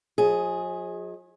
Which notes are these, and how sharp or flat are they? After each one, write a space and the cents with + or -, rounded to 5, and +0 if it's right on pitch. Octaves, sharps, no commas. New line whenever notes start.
F3 +45 G#4 +0 D#5 +25